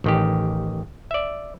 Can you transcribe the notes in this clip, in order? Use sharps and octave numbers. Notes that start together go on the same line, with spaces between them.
A1 D#3 G4
D5 E5